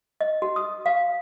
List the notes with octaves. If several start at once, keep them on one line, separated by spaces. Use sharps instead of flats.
D#5
F#4
D#6
F5